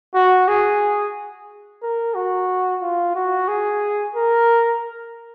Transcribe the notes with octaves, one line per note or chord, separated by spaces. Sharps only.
F#4
G#4
A#4
F#4
F4
F#4
G#4
A#4